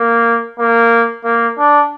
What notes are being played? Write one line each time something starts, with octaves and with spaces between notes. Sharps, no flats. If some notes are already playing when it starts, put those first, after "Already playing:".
Already playing: A#3
A#3
A#3
D4